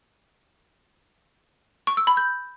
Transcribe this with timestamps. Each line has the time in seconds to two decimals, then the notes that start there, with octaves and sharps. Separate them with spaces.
1.87 C#6
1.97 E6
2.07 B5
2.17 G6